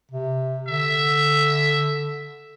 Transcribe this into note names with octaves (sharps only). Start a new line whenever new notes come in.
C3
D3 E5